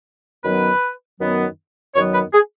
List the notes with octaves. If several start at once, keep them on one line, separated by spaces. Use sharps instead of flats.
F#2 D#3 F#3 B3 B4
F#2 D#3 F#3 B3
F#2 D#3 F#3 B3 C#5
B4
G#4